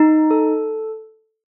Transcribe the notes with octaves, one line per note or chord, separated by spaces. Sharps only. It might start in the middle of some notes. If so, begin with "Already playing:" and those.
Already playing: D#4
A4